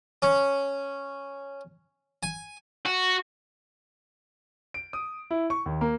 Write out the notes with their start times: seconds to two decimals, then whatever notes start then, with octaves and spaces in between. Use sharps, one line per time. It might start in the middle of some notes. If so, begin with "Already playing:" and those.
0.22 C#4
2.23 G#5
2.86 F#4
4.74 D7
4.93 D#6
5.31 E4
5.50 C#6
5.66 D#2
5.81 A#3